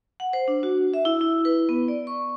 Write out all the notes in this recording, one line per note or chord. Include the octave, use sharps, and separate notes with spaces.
F#5
C5
D4
F#4
E5
E4
E4
B4
B3
D5
C#6